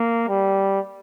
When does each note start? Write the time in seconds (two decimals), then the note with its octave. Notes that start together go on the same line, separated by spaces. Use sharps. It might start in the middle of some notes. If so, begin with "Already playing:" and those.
Already playing: A#3
0.28 G3